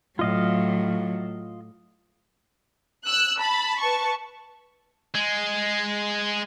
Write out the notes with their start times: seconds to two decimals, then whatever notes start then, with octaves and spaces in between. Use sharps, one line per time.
0.19 A2 F#3 F4 D#5 F5
3.06 E6 F#6
3.40 A5 B5
3.81 B4 A5 C#6
5.15 G#3